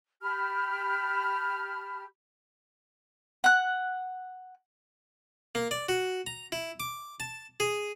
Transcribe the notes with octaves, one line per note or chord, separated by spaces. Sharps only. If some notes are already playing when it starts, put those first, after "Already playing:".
G4 A5 B5 F6
F#5 F#6
A#3
D5
F#4
A#5
E4
D6
A5
G#4